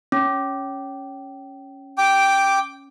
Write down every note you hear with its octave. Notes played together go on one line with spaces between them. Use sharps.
C#4
G5 D6